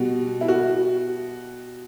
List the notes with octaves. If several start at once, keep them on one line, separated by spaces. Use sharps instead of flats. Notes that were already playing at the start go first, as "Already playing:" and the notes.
Already playing: B2 G3 F#4
E4
F#4